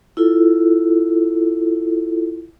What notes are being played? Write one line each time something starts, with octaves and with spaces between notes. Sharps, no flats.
E4 F4 A4